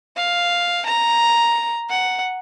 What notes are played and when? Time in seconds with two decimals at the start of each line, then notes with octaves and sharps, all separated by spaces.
0.16 F5
0.86 A#5
1.89 F#5